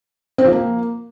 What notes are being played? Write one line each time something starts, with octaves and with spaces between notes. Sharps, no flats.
C4
F3
A#3